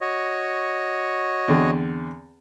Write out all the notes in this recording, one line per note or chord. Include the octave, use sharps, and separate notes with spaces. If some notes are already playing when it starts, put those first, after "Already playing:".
F#4 C#5 D#5
E2 D3 C4